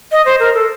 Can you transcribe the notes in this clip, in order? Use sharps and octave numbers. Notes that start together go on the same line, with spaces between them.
D#5
C5
A#4
A4